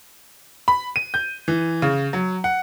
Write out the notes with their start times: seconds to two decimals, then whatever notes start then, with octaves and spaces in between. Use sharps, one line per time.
0.68 B5
0.96 D#7
1.14 G6
1.48 E3
1.82 C#3
2.13 F#3
2.44 F#5